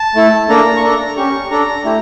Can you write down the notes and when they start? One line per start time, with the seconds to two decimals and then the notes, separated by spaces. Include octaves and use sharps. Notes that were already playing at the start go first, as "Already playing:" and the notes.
Already playing: A5
0.15 A3 E4 A4
0.49 A#3 D4 A4 A#5
0.77 C#6
0.82 D4 A4 A#5
1.17 C#4 G4 C#6
1.51 D4 A4 A#5
1.85 A3 E4 G4